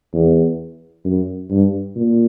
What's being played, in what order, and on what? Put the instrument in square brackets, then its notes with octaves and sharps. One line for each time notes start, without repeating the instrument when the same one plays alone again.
[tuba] E2
F#2
G2
A#2